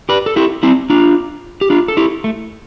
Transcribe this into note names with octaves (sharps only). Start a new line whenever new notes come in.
G4 B4
A4
E4 G4
C4 E4
D4 F4
G4
D4 F4
A4
E4 G4
A3